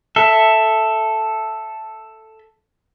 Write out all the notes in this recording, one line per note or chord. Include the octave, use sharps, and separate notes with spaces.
A4 E5